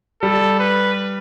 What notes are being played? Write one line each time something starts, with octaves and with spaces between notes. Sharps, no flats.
G3 A4
B4